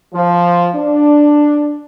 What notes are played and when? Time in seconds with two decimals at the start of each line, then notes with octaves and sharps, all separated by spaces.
0.14 F3
0.75 D4